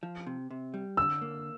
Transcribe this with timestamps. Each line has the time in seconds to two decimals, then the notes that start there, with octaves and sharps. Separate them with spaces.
0.03 F3
0.27 C3
0.51 C3
0.74 G3
0.97 D3 E6
1.22 A#3